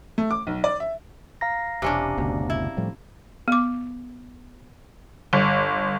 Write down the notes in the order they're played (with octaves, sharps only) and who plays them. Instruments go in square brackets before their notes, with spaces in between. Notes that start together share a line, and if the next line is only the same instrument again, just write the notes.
[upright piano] A3
D6
B1
D5
E5
[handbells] F5 A#5 A#6
[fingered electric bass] E1 [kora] C3 C#4 D4
[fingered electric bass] F#1 D2 B2
[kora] E4
[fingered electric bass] A2 F3 G3
[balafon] B3 D6
[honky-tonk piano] G1